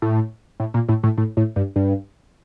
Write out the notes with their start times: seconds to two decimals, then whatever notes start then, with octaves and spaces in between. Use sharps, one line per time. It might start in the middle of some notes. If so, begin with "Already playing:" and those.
0.02 A2
0.60 A2
0.74 A#2
0.89 A2
1.03 A2
1.18 A2
1.37 A2
1.56 G2
1.76 G2